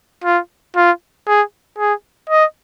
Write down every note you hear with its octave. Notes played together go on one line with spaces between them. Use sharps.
F4
F4
G#4
G#4
D#5